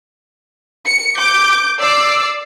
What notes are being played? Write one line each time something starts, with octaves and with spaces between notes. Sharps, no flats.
C#7
D6 G6 D7
D5 D6 E6 C7